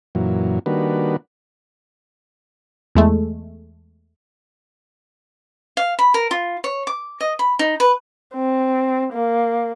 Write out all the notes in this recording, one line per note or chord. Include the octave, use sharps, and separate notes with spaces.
F#2 A#2 E3 F#3
D#3 G3 A#3 D4 F#4 B4
E2 G#3 A3
F5
B5
A#4
F4
C#5
D6
D#5
B5
D#4
B4
C4
A#3